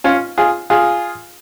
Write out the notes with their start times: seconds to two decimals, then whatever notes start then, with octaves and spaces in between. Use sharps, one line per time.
0.04 C#4 F4
0.38 F4 G#4
0.70 F4 G#4